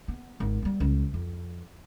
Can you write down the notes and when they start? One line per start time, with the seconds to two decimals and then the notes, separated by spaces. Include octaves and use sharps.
0.08 B3
0.40 G#1
0.62 G3 B3
0.80 C#2
1.14 F2